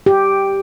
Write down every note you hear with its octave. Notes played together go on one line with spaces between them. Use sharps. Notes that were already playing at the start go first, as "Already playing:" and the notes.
G4